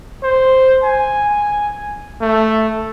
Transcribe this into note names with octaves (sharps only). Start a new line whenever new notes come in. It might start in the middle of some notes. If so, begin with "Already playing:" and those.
C5
G#5
A3